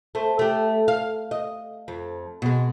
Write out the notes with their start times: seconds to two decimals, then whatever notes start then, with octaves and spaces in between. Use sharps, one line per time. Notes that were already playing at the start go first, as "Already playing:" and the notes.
0.15 A3 C4
0.39 A3 G4
0.88 F5
1.31 D#5
1.88 F2
2.42 B2 G#3